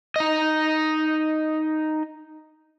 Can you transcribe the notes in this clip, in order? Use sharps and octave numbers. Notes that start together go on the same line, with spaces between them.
D#4 D#5